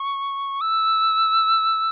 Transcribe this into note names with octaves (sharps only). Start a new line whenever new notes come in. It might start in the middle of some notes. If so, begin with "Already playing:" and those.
Already playing: C#6
E6